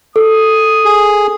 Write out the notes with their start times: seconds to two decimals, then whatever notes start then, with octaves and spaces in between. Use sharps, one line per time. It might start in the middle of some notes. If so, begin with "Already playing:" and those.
0.16 A4 D#6
0.85 G#4